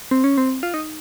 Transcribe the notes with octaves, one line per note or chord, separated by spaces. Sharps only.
C4
C#4
C4
F4
D#4